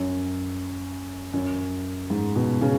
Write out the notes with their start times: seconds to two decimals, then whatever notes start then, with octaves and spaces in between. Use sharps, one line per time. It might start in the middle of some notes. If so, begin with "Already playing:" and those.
Already playing: F#2
1.34 F#2
2.10 G#2
2.36 B2
2.61 C#3